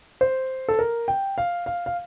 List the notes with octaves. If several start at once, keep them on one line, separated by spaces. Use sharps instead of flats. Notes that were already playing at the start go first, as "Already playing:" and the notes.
C5
A4
A#4
G5
F5
F5
F5